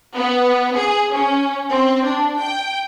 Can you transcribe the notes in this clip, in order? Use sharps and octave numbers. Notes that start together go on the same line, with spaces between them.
B3
G#4
C#4
C4
D4
G5